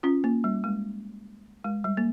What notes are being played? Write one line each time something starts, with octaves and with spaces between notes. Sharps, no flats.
C#4 F4
A#3
G3
G#3
G#3
G3
A#3